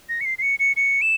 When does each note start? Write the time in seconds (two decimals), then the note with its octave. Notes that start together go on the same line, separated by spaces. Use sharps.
0.09 A#6
0.21 C#7
0.25 C7
0.38 C7
0.42 C#7
0.60 C#7
0.76 C#7
1.02 E7